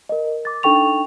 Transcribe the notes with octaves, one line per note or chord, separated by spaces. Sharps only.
A#4 D#5
D6 A6
D4 D#4 A4 G5 C#6 F7